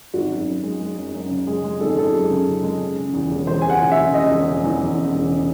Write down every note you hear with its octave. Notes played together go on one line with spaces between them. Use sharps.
G#1 F#4
F#2
F#2
G#3
G#3
F#2
F#2
C#3
G#3 G#4
G#3
G#1 A4
G#4
G#3 A4
F#2 G#4
C#3
C#3
G#3
C#3
C#3
E2
E1
E1 C5
E1 G#5
F#5
C#3
E5
C#3
C#3 D#5
E1
C#3
E2
E2
C#3
E1
C#3